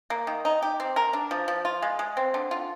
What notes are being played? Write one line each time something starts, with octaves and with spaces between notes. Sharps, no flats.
A#3
D#3
D#4
G4
C4
A#4
D4
F3
F3
F4
G#3
G#3
C4
D3
F4